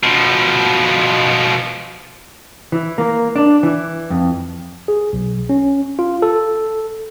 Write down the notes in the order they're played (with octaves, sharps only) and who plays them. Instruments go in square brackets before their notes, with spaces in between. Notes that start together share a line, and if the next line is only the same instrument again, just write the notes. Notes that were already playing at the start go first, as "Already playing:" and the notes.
[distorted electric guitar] B2 F3
[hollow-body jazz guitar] E3
A#3
D4
E3
F2
[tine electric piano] G#4
B1
C#4
F4
A4